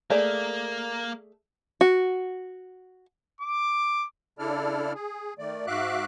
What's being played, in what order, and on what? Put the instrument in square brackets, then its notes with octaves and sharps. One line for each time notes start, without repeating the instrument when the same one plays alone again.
[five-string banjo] A3 G#4 D5 [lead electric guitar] A#3 A#4
[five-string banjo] F#4
[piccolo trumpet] D6
[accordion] C#3 D4 E4 A4 D5 F6
G#4
D#3 A3 D5
G#2 F#4 E5 F5 D6 F#6